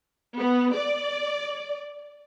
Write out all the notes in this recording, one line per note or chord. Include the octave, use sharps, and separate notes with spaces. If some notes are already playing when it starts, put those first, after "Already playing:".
B3
D5